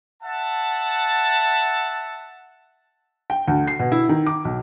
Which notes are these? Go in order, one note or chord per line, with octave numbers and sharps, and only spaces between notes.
E5 F#5 A5
G5
D2
C7
B2
E4
D#3
D6
B1